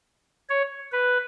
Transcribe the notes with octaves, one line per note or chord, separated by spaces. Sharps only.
C#5
B4